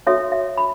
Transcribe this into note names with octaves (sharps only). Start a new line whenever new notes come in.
F#4 A4 C#5 E5
E5
B5